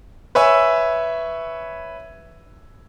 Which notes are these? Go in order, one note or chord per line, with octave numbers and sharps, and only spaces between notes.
B4 C#5 E5 G#5 E6